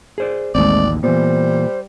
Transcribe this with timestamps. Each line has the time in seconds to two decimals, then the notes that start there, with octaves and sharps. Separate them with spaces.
0.18 G#4 C5 D5
0.55 A1 D#2 G#3 A3 C4 D5
1.03 A#2 E3 G3 B3 C5